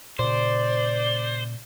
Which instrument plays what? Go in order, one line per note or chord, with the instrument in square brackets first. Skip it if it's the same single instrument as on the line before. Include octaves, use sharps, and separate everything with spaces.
[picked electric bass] A#2 C#3 [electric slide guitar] C5 [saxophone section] D5